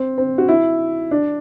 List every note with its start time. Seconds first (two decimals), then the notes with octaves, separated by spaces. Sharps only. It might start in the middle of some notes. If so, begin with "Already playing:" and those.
Already playing: C4
0.18 C4
0.38 F#4
0.48 E4
1.11 D4